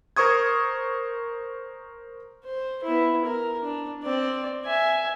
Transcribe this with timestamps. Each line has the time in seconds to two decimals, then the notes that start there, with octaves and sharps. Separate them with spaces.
0.16 A#4 C5 C#6 D#6 G#6
2.44 C5
2.83 B3 E4
3.24 A#4
3.63 D4
4.03 C4 D5
4.65 E5 G#5